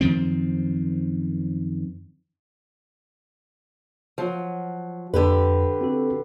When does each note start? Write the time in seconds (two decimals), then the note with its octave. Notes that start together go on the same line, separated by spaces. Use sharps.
0.01 F#2 D#3 F3 C4
4.18 F3 F#3
5.14 F2 D3 G4 B4
5.81 C4 F#4 A4